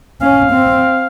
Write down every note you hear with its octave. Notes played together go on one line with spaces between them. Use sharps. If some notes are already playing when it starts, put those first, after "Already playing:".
C#4 F5
C4